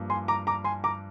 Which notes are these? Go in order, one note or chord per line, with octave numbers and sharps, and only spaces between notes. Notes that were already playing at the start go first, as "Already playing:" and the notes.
Already playing: G2 F3 A#3
G#5 C6
A#5 D6
A#5 D6
G#5 C6
A#5 D6